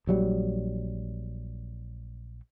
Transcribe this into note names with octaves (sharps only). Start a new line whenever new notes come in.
A#1 F#3 G3